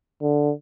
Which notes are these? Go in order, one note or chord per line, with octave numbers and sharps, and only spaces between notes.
D3